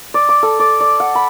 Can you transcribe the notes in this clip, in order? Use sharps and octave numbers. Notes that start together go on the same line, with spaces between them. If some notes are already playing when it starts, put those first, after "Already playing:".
D5
D6
A4
D5
D5
F#5
B5